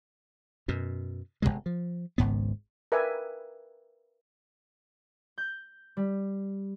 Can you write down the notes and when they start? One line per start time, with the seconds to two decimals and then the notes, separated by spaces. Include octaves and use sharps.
0.68 F#2 B2
1.42 G1 E2 C3 G#3
1.66 F3
2.18 G#1 C#2 G#2 B3
2.92 A#4 B4 D5 E5 G5 G#5
5.38 G6
5.97 G3